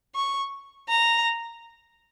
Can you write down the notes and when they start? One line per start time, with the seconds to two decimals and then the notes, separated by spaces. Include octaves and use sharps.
0.15 C#6
0.89 A#5